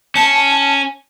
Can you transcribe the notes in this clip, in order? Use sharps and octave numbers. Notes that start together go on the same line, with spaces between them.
C#4 A5